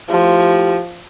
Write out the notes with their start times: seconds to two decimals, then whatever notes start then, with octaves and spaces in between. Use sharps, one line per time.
0.10 F3 A3 E4 G4